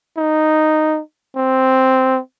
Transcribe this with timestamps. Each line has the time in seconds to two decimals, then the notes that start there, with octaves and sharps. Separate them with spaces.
0.17 D#4
1.36 C4